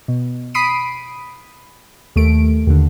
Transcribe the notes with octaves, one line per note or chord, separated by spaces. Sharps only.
B2
B5 D#6 B6 C7 D7 D#7
D#2 A3 D7
D#2 D3